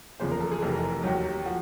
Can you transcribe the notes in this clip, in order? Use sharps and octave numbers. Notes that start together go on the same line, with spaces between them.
F#1 E2 C#3 F3 C5
A#4
A4
G#4
F1 F2 C3 E3 A4
A#4
A#4
D#2 D#3 F#3 G4
G4
F3 F#4